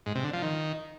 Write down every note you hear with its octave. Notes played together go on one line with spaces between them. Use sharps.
G#2
C3
D3
F3
D#3